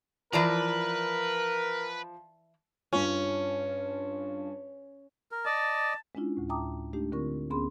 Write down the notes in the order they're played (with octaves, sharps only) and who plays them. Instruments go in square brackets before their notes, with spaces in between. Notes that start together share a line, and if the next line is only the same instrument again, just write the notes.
[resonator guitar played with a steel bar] E3 D5 A#5 [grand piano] F3 [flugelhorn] A#4 [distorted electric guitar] B4
[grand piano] G2 F4 [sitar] C#4
[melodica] A#4
[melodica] D5 D#5 [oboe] A5
[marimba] G#3 C#4 D4 E4 F4
D2 A2
E5 G5 A5 A#5 D6 D#6
G#3 A3 D4 D#4 G4
D3 C4 F4 A#4 C#6
D2 B3 C#4 G#4 B5 C6